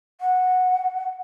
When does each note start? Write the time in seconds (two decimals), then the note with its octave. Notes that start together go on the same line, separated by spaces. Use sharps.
0.21 F#5